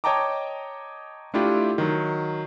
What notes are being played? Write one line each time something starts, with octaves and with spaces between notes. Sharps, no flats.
C#5 D#5 G5 A5 A#5 D6
A3 D4 E4 F4 G4
D#3 F#3